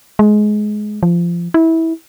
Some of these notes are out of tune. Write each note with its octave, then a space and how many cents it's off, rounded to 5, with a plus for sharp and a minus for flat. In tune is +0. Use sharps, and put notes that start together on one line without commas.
G#3 +20
F3 -20
E4 -20